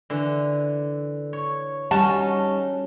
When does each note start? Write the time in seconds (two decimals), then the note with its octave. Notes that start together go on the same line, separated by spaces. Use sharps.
0.10 D3 E3
1.33 C#5
1.91 G3 C#4 D#4 F#4 A5